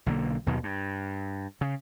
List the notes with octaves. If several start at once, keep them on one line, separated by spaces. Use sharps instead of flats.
B1 D3 A#3
D#2 B2 D#3 F#3
G2
C#3